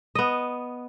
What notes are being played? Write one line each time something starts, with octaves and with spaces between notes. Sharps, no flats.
B3 D#5